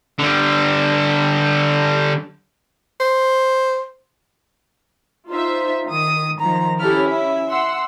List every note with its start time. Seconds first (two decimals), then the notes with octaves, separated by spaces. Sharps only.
0.19 D3 G3
3.00 C5
5.30 D#4 F4 C5 E5
5.89 D#3 D#6
6.40 D#3 F3 A#5
6.80 C#4 E4 G4 A4 F6
7.09 E5
7.49 F#5 C6 E6